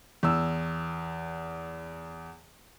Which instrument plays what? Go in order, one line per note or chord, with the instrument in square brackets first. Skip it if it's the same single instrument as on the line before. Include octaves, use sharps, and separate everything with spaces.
[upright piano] E2 E6